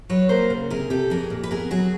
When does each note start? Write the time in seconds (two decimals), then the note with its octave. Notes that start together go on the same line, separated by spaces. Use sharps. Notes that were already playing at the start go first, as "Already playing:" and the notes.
0.09 F#3 B4 C#5
0.29 A#3 A#4 C5
0.50 C#3
0.70 C3 G#4 A#4
0.90 C3 G4 A4
1.10 F2 G#4 A#4
1.30 A#2
1.43 B4
1.51 B3 G#4 A#4
1.71 F#3 F#4 G#4